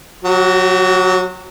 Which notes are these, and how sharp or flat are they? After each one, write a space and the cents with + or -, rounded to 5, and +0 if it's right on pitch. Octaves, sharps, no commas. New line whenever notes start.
F#3 -15 F#4 +40